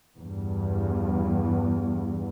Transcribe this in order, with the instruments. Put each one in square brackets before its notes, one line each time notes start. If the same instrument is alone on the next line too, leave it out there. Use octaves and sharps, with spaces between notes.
[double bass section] E2 G2